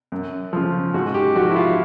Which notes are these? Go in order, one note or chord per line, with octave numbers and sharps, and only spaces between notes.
F#2
C#3 F3
G#2 F#4
G4
F3 F#4
E4
F4